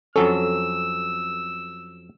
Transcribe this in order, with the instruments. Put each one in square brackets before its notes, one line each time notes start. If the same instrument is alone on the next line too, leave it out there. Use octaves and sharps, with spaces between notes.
[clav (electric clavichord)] F2 F#3 C#4 [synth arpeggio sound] A4 [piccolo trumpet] E6